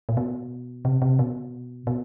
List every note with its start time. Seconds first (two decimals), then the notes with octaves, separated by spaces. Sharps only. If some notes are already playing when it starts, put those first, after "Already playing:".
0.09 A#2
0.17 B2
0.85 C3
1.02 C3
1.19 B2
1.87 B2